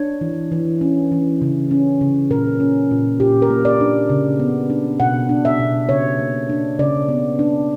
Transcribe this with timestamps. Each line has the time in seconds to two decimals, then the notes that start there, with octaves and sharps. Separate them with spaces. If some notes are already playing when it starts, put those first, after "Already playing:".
Already playing: D4 C#5
0.21 E3
0.52 E3
0.81 C#4
1.12 E3
1.42 C#3
1.71 C#4
2.01 C#3
2.30 A#2 A#4
2.60 C#4
2.91 A#2
3.20 A#2 G4
3.42 A#4
3.50 A#3
3.65 D5
3.80 D4
4.09 C#3
4.39 B3
4.70 D4
5.00 B2 F#5
5.29 D4
5.45 E5
5.60 B2
5.89 C#3 C#5
6.19 A#3
6.49 D4
6.79 C#3 D5
7.09 B3
7.39 D4